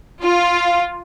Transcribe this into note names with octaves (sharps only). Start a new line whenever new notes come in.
F4